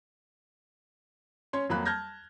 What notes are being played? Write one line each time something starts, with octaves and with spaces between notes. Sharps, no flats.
C#4 C#5 C6
F2 F#3 A#3 B5 F#6
A5 F6 G6 G#6 A#6